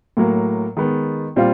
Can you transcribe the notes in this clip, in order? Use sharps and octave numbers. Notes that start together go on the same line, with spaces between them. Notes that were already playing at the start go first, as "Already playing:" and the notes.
A2 F#3 A#3
D#3 G#3 B3
A#2 G3 C4 F4